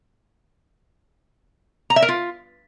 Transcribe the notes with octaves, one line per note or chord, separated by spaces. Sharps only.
A#5
E5
A#4
F4